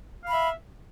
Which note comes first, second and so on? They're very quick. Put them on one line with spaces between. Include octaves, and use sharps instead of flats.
F5 B5 E5